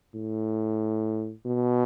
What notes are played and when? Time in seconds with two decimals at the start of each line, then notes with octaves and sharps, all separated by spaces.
0.15 A2
1.46 B2